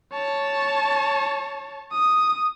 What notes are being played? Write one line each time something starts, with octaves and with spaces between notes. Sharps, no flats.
C#5 A5
D#6